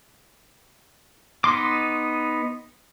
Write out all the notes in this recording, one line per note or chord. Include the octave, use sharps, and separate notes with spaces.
B3 D#4 C6 D6